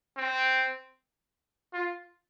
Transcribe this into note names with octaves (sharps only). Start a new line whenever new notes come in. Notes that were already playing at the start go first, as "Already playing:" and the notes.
C4
F4